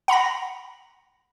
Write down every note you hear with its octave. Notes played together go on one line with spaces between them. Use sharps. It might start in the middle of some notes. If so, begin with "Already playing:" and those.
F#5 A#5 B5 A#6